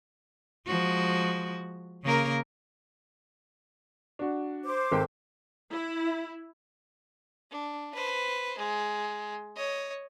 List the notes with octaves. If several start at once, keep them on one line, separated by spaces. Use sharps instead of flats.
F3 G#3 F#4
C#3 A#3 A#4
D4 F#4
C5 D6
G#1 A4 G5
E4
D4
B4 C5
G#3
C#5 D#5